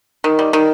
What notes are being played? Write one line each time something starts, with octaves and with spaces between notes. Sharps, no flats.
D#3
G3
D#3